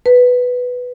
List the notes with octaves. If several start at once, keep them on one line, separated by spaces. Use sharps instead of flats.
B4